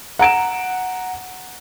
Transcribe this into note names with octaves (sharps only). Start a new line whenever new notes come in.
F#5 A#5 D7 E7